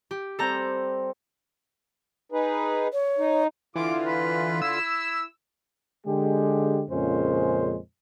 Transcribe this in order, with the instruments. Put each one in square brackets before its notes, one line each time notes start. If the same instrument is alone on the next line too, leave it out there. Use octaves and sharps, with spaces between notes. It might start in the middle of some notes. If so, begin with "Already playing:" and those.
[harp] G4
[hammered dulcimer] G3 C4 [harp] A4 A#5 G6
[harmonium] D#4 G#4 B4
[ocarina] C#5
[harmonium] D#4
[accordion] D3 F4 [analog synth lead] E3 [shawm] D6
[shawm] B4
[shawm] E4 [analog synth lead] E6
[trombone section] D3 G#3 G4
F2 A#2 C#3 G#3 C#4 C5